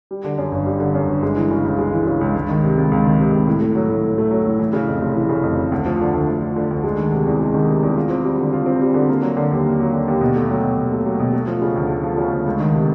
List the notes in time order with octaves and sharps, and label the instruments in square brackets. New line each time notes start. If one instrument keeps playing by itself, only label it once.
[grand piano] G3
D3
F#2
G1
G3
D3
F#2
G1
G#3
E3
C#3
C#2
G#3
E3
C#3
C#2
C#2
D#3
C3
C#2
C#2
D#3
C3
C#2
A2
A3
F#3
A2
A2
A3
F#3
A2
E3
C#3
F2
F1
E3
C#3
F2
F1
D2
F3
D3
D2
D2
F3
D3
D2
G#3
D#3
C3
E2
G#3
D#3
C3
E2
F4
C4
G3
D3
F4
C4
G3
D3
A#3
F#3
D3
D#2
A#3
F#3
D3
D#2
B2
A3
F#3
B2
B2
A3
F#3
B2
A3
F3
C#3
D2
A3
F3
C#3
D2
C#2
D#3
C3